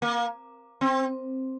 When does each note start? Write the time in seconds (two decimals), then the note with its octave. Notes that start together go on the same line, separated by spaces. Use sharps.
0.02 A#3
0.81 C4